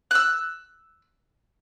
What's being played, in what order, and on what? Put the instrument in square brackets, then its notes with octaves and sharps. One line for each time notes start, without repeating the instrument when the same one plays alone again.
[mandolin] E6 F#6